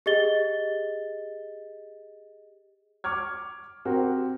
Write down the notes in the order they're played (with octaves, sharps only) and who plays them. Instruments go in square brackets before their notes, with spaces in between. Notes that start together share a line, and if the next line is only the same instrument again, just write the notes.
[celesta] G4 G#4 D#5 A6 G7
[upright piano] C#6 D6 F6 G#6
C4 F#4 G4 A#4